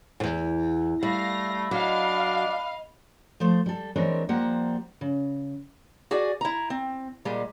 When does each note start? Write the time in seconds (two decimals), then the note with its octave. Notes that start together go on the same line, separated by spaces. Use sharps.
0.20 E2 G#2
1.03 G3 A3 F5 B5 A#6
1.71 F#3 D4 D#5 F5
3.40 F3 A3 C5
3.66 G3 A4
3.96 E3 G#3 C4 D4 A#4 C#5
4.29 F3 G3 A#3 C4 F#5 A#5
5.01 C#3
6.11 F#4 G#4 D5 G#5
6.41 E4 A#5
6.70 C4
7.25 A#2 G3 G#3